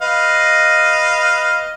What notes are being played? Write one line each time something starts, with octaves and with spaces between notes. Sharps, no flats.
B4 D#5 F5